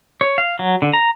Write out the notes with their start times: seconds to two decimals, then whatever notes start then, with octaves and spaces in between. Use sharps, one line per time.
0.21 C#5
0.38 F5
0.59 F#3
0.82 D3
0.93 A#5